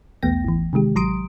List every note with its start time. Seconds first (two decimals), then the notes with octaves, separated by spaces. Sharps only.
0.23 B1 E2 A3 B3 G5 A#6
0.44 G#1 E3
0.73 C3 D#3 G#3 G4
0.95 A1 F#3 A#5 C6 D#6 D7